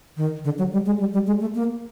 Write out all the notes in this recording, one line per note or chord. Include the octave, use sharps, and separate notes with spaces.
D#3
D3
F#3
G3
G#3
G3
G3
G#3
A3
A#3